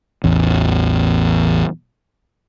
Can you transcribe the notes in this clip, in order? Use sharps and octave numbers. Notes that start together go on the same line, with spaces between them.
A1 E2